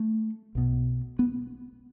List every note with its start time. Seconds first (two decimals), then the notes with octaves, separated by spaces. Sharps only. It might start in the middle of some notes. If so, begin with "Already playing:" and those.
Already playing: A3
0.55 B1 B2
1.19 B3